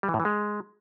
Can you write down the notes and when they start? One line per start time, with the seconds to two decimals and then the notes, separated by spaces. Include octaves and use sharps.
0.03 G3
0.09 E3
0.14 A2
0.20 E3
0.25 G#3